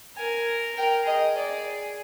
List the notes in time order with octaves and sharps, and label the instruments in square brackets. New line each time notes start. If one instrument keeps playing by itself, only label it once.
[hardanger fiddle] A#4 [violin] G#5
[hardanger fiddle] A#4 [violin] G5
[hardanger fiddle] G#4 [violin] D#5
[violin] D5